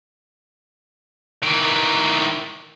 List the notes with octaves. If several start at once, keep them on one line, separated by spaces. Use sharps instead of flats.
D#3 E3